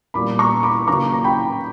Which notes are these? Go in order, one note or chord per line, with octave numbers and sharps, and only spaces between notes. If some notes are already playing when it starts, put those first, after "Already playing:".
A#2 G3 B3 B5 D6
A#5 C#6
B5 D6
C#3 F#3 A#3 A#5 C#6
A#5
G5 B5